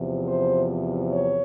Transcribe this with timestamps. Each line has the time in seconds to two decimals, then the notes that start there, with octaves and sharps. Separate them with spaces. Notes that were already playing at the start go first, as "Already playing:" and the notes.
Already playing: E2 C3 F3
0.24 C5
1.11 C#5